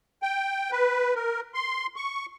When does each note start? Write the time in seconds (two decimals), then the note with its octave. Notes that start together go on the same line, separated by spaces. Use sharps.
0.23 G5
0.71 B4
1.15 A#4
1.54 C6
1.96 C#6